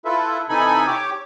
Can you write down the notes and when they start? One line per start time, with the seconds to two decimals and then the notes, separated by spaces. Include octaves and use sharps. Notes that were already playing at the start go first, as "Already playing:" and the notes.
0.05 E4 F4 A4 B4 E5
0.49 C3 E3 D#4 A4 G#5 B5
0.87 G4 C#5 D6